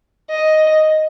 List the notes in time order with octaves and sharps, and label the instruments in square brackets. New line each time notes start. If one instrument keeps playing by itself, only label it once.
[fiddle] D#5